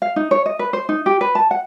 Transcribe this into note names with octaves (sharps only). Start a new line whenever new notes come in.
F5
D#4
C#5
D#5
B4
C5
D#4
G4
B4
A5
F#5